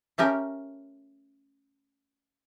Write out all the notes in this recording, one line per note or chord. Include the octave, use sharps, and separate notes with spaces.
A3 C#4 G4 A#4